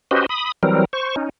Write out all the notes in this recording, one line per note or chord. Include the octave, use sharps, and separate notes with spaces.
C#4 F#4 G4 B4 C5 D#5
B5 D#6
E3 F#3 G3 C4 A#4
C5 C#6
C#4 D#4